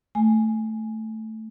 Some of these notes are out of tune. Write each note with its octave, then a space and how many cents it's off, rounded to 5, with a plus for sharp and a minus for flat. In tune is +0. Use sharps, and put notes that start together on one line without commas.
A3 +0 G#5 +0